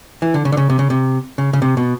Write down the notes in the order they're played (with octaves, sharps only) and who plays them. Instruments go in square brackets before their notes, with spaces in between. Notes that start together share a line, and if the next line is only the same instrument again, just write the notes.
[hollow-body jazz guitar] E3
D3
C#3
D3
C#3
C3
C#3
C3
C#3
C#3
C3
B2